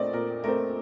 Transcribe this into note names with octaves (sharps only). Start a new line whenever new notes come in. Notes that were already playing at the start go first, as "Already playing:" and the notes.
Already playing: A#2 A3 C4 D5 D#5
A#2 A#4
A3 C4 A#4